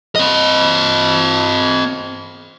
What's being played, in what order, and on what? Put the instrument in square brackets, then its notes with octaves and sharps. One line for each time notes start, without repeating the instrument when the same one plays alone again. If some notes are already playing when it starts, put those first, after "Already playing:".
[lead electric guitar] C4 D#5